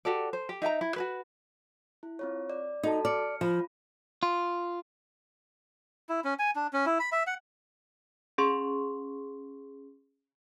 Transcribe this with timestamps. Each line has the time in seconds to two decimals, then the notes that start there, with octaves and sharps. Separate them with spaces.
0.05 F#4 G4 A4 D5
0.33 C5
0.49 G4
0.62 D#4 E5 G5 A#5
0.81 E4
0.96 F#4 G#4 B4
2.03 E4
2.19 C4 F4 C#5
2.50 D5
2.83 D#4 F#4 A4 A5
3.05 D5 F6 C#7
3.41 F3 F4 B5
4.23 F4
6.09 E4
6.24 C#4
6.39 G#5
6.56 D4
6.73 C#4
6.86 E4
7.00 B5
7.12 E5
7.27 F#5
8.38 C#4 G#4 C6 C#6